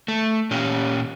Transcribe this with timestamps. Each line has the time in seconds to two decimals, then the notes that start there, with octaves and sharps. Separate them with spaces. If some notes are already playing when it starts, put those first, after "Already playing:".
0.08 A3
0.51 A#2 C#4 G4